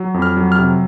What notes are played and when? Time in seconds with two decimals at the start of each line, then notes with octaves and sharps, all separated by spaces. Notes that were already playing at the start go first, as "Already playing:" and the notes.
Already playing: F#3
0.14 F2
0.22 F6
0.37 F#3
0.52 F6
0.59 C3